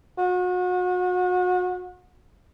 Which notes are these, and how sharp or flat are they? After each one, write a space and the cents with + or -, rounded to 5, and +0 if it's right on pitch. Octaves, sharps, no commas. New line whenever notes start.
F#4 -35